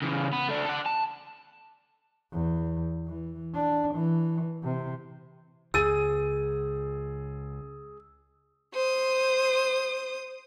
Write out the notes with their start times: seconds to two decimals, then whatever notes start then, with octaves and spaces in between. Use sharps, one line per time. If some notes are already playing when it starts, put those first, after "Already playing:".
0.02 C#3 E3
0.33 B3
0.49 A3 D4
0.65 A4 F#5
0.86 A5
2.32 E2
3.06 E3
3.54 D4
3.95 E3
4.64 C3
5.74 C#2 G#4 E6 A6 D#7
8.73 C5 D#6